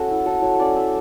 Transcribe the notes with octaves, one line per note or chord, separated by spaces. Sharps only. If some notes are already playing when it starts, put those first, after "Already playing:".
Already playing: C#4 F#4 A4
E4
F#3 A4
F#3 C#5
C#4 D5
A3 E5